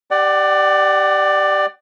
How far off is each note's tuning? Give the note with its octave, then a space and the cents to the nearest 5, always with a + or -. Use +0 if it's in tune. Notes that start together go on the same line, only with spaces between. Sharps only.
G4 -10 D5 +15 F#5 +30